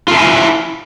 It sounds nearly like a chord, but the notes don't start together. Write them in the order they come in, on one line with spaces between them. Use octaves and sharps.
F4 A4 E5 G#5 E4